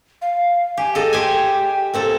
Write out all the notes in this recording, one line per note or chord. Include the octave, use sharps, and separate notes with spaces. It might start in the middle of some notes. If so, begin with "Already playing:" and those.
F5
G4 G#5
G#4 A4 D#5
G4 C5 G5 G#5
A#2 C4 A4